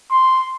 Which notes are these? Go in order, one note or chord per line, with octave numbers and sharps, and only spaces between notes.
C6